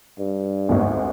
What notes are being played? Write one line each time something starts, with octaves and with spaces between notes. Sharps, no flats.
G2
G#1 D2